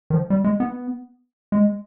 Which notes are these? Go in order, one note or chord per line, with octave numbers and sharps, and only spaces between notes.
D#3
F3
G3
G#3
B3
G#3